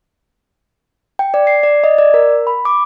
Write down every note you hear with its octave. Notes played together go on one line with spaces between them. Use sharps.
G5
D5
C7
D5
D#5
D5
A#4
B5
D6